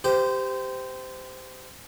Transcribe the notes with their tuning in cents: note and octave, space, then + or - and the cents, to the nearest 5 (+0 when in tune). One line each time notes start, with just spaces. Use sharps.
G4 +0 C5 -25